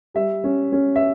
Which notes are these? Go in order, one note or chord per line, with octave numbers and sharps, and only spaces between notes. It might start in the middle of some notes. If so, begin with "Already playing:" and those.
G3 E5
C#4
C#4
E5